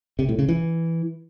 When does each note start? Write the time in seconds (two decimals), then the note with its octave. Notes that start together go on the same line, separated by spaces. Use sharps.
0.19 C3
0.29 A2
0.39 C#3
0.48 E3